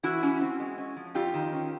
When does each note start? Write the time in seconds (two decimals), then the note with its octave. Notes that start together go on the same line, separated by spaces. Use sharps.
0.03 E3 E4 F#4
0.23 C#4
0.41 C4
0.59 G#3
0.78 C#4
0.96 F3
1.15 F2 F4 G4
1.34 D#3
1.52 C#4